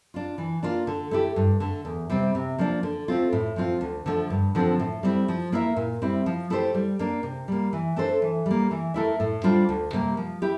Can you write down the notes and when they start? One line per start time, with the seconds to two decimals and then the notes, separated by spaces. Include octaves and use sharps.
0.14 D4 F4
0.38 E3
0.63 A#3 D4 F4
0.87 D3
1.11 A3 E4 G4
1.36 G2
1.60 D3 A3
1.85 E2
2.10 C3 G3 C4
2.35 C3
2.58 F3 A#3 D4
2.83 D3
3.08 A3 C4 F4
3.32 A2
3.56 F3 C4 F4
3.81 D2
4.06 D3 F3 A3
4.30 G2
4.55 D3 F3 C4
4.79 A2
5.03 G3 C4 E4
5.28 F3
5.52 A#3 E4 A#4 E5
5.76 A#2
6.02 G3 C4 E4
6.26 F3
6.50 A3 E4 G4 C5
6.75 G3
6.99 A#3 D4
7.23 C3
7.48 G3 A#3
7.73 E3
7.96 A3 D4 A4 C5
8.22 E3
8.46 G3 A#3
8.71 E3
8.94 A3 E4 A#4 E5
9.20 A2
9.43 G3 D4 F4 C5
9.69 D2
9.93 C3 G3 A#3
10.17 F3
10.42 E4 G4